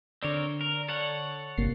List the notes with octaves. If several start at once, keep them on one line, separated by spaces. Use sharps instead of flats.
D3 C4 A#4 C#5 D5
A#4
A4 C#5 F#5
G1 C3 A#3 C7